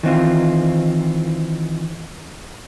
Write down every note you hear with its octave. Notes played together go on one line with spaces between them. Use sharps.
D#3 E3 C4 F4